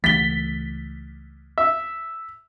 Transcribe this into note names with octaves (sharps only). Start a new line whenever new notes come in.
C#2 E3 A3 A6 B6 G7
E5